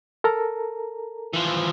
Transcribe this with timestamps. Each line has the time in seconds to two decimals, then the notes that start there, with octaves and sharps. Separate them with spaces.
0.24 A4 A#4 A#5
1.34 E3 F3